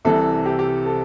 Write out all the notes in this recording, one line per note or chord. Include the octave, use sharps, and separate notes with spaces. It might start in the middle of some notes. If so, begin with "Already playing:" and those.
C2 C3 E3 A4
G4
G4
A4